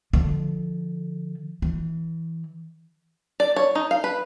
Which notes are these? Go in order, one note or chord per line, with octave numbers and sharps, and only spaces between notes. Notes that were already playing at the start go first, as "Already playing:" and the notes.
D3 F3
E3
D5
C#5
D#4
F5
B4